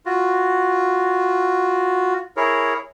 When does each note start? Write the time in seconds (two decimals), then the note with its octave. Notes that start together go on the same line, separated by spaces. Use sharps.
0.06 F4 F#4
2.37 E4 G#4 A#4 C#5